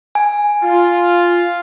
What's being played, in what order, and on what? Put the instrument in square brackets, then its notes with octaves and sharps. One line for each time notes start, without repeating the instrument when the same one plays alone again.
[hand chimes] G#5
[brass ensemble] F4